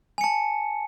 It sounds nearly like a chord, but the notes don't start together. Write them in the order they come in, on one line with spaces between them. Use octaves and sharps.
G#5 C#7 A5